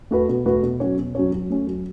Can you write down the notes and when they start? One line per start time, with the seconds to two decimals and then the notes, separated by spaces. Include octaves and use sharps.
0.11 A3 F#4 B4
0.29 B2
0.46 A3 F#4 B4
0.63 B2
0.80 F#3 C#4 F#4 C#5
0.98 B2
1.15 F#3 C#4 F#4 C#5
1.32 F#3
1.50 A3 C#4
1.67 F#3